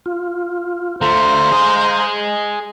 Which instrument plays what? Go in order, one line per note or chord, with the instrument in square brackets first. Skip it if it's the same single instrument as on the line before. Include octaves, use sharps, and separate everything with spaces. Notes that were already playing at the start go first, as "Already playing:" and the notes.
[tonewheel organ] F4
[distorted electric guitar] D3 A3 [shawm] C5 [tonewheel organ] F5 A#5
[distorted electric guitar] G#4 D#5